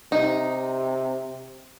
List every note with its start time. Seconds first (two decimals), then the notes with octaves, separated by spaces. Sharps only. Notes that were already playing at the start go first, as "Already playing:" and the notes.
0.12 C3 D#4